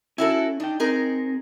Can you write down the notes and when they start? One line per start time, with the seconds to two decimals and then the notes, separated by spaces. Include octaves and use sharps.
0.18 C#4 E4 F#4 A4
0.60 D4 D#4 G5
0.80 C4 D#4 G#4 A#4